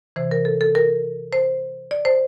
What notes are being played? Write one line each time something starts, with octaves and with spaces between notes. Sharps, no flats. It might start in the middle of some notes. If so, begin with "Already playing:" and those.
C3 E3 C5
A#4
A4
A4
A#4
C5
D5
C5